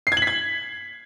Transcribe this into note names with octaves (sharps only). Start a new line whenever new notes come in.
C7
G#6
F#7
B6
G#6